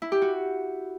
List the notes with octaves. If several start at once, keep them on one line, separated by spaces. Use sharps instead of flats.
E4
G4
F#4